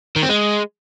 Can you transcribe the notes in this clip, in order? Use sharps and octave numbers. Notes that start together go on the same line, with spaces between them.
D#3
C4
G#3